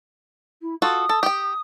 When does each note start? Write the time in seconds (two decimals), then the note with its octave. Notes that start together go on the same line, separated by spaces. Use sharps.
0.62 E4
0.82 F4 F#4 A4 D#6
1.09 A4
1.23 G4 G5